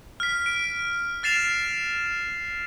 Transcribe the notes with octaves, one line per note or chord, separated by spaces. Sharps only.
F6 B6
D7
F6 A6 C7 E7 F7